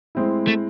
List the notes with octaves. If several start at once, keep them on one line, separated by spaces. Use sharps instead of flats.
A2 G#3 C4 E4
A3